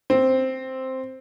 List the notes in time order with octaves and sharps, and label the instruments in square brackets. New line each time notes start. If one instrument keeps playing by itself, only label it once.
[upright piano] C4